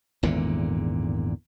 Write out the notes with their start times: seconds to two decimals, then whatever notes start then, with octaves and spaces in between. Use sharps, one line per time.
0.23 G#1 E2 A#2 D3